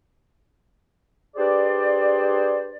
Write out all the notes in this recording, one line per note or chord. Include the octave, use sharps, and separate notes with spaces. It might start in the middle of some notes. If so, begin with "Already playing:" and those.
D4 G4 G#4 B4 C5 D5